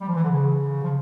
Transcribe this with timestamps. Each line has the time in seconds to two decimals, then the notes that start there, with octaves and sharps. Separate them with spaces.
0.01 G3
0.08 F3
0.15 E3
0.23 D3
0.29 C#3
0.82 F3